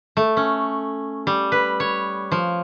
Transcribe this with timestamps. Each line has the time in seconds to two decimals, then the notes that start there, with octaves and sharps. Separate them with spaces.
0.17 A3
0.37 C#4
1.27 G3
1.52 B4
1.80 C#5
2.32 F3